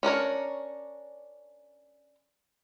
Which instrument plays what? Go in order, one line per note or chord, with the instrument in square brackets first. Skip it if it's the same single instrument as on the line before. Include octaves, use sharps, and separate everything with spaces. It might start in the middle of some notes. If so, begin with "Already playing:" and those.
[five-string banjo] C#4 D4 A#4 C#5